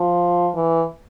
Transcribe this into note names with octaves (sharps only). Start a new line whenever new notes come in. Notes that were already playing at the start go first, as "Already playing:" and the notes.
Already playing: F3
E3